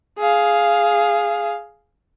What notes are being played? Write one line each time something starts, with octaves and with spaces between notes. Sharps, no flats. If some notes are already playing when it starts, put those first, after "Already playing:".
G#4 F5